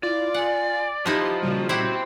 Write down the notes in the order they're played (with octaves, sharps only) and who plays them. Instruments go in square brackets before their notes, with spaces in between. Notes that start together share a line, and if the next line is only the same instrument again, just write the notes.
[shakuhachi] E4 [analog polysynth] F4 [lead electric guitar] D5
[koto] F#5 [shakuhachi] G#5
[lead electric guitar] F3 [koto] B3 D#4 E4 [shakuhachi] G4 [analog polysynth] C6
[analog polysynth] A#2 C#3 G3 [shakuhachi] F#4
[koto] E4 G4 F#5 [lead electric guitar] C5 G5